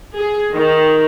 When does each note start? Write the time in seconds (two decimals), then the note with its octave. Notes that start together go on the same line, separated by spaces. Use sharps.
0.18 G#4
0.53 D#3